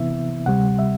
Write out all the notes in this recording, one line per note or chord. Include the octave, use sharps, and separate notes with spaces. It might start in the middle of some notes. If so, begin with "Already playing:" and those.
Already playing: C3 E3 B3 E4 E5
D2 C3 G3 F#5
E5